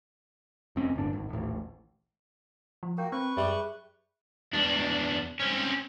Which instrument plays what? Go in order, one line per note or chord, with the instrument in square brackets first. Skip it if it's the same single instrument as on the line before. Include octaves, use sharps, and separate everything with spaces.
[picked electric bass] F1 C4 C#4
D1 G1 D4
G#1
D#1 A1
[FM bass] F3
[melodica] A#3 F#4 [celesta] A#4 G5 G6
[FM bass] C4 [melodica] B4 C#6
[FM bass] F#2 [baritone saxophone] G3 [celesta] G#4 E5
[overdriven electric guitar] E2 D4
C4 C#4